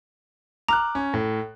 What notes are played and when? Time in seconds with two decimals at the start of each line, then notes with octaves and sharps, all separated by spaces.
0.69 A#5 D6 F6 F#6
0.95 C#4
1.14 A2